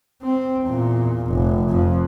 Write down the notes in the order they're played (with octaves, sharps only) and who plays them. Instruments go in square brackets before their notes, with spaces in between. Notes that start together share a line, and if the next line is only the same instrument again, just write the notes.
[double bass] C4
E2 A#2
F1
F2